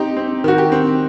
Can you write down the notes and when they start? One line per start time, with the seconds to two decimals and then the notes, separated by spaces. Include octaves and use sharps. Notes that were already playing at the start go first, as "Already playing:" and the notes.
Already playing: C4 D#4 G4
0.17 C4
0.44 D#3 F#4
0.58 G4
0.72 C4